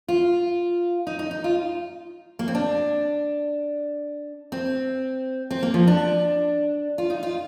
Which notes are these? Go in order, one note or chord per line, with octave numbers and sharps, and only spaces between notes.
F4
D#4
D#4
D#4
F4
A#3
C4
D4
C4
C4
A#3
F3
D4
F4
D#4
F4